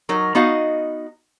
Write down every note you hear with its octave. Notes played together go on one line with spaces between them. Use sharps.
F#3 D#4 A#4
B3 D#4 F#4 D#5 F5